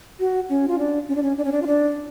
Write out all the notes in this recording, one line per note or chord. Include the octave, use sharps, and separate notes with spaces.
F#4
C#4
F4
D4
C#4
D4
C#4
D4
C#4
D4
F4
D4